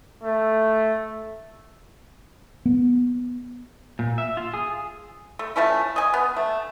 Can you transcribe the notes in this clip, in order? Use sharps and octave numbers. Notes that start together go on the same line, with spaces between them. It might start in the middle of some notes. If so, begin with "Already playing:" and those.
A3
B3
A#2
E5
F4
G#4
A3
F3 A3 C#4 E4
D#5 G#5
B3
A3